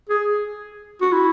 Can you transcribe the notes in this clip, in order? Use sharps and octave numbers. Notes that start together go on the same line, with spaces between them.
G#4
F#4
E4